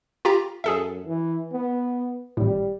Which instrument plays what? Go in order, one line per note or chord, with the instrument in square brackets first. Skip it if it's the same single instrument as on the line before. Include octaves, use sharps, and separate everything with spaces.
[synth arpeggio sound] F4 G4 A#5
[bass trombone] F#2 [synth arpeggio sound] G#4 A4 E5
[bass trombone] E3
B3
[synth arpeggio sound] G#1 A2 [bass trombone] G3